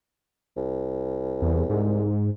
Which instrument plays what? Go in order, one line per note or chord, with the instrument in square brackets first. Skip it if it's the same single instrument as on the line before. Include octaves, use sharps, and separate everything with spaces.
[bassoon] C2
[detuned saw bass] E2
G#2